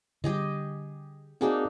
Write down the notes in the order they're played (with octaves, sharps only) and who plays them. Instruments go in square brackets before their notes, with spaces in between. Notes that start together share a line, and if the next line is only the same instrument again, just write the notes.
[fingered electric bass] D3 G3 [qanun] G4 G#4 D#5
[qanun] A#3 D4 D#4 [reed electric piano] C4 F#4 G#4